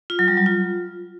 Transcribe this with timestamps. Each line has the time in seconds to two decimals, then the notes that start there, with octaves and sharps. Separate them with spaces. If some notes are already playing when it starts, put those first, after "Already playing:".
0.10 F4
0.19 F#3
0.28 G3
0.37 F#3
0.46 F4